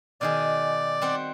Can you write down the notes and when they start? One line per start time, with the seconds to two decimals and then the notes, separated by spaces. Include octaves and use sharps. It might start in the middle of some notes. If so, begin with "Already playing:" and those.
0.21 B2 D#3 G#4 D5
1.02 G3 C4 F#5